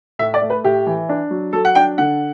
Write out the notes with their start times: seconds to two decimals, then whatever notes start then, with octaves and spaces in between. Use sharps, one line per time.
0.19 A2 E5
0.34 D5
0.41 A3
0.50 B4
0.64 A2 G4
0.86 E3
1.09 D4
1.31 F#3
1.53 F#3 A4
1.65 F#5
1.75 D4 G5
1.98 D3 F#5